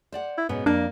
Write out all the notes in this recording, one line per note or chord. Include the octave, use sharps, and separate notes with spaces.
C5 D5 F#5
E4
G#2 B2 B3 C#4
F2 A#3 D4 D5